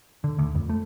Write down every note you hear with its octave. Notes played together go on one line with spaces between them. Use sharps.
D3
D2
F2
A3